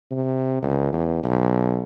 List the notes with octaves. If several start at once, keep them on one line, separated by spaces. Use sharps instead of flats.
C3
C#2
E2
B1